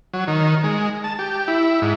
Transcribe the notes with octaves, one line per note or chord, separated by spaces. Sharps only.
F#3
D#3
G#3
A5
G4
E4
G#2